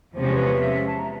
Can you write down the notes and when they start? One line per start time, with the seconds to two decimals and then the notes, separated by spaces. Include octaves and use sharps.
0.14 E2 C3 F3 G#3 C#4 C5
0.33 B4
0.45 D#5
0.50 E5
0.86 A5
0.99 A#5